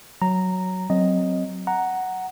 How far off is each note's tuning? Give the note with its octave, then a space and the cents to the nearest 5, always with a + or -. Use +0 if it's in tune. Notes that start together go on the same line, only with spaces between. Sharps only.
F#3 +0 A#5 -10
F#3 +0 C4 +0 D#5 +0
F#5 +5 A#5 +0